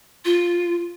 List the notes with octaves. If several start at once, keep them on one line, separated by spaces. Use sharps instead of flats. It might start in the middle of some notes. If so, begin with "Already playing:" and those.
F4